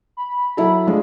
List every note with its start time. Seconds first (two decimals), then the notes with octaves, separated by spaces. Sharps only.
0.17 B5
0.57 F#3 E4 A4 B5
0.87 F3 G#3 A3 D4